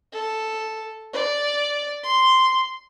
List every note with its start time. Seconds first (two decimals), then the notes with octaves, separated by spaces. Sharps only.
0.13 A4
1.13 D5
2.03 C6